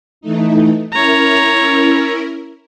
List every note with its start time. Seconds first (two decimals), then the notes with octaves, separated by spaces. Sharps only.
0.21 E3 A3 D#4
0.92 C#4 E4 A#4 C#5 A#5